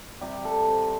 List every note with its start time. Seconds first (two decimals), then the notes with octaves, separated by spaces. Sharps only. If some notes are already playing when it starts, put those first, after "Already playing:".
0.21 C3 G3 G4
0.45 A4
0.68 C4